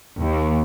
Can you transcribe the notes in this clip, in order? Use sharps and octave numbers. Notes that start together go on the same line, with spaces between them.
D#2